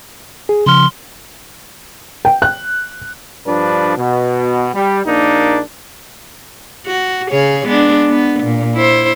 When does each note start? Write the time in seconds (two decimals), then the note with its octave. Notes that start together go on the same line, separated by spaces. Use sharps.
0.49 G#4
0.66 C#3 F3 C6 F6
2.25 G5
2.42 F#6
3.46 G2 F3 D4 B4
3.96 B2
4.74 G3
5.06 A#1 A#3 D4 D#4
6.87 F#4
7.30 C#3 G#4 C#5
7.67 G#3 B3 D4
8.10 B3
8.43 A#2
8.75 E4 C5